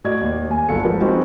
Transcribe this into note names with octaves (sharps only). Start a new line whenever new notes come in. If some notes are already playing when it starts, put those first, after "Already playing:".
A2 F#4 D5 D#5 G#6
D#2
D#2 G#5
G1 F#3 A4 C#7
F3 G#3 A#3 A#4 B4
G3 G#3 C4 D#4 F#4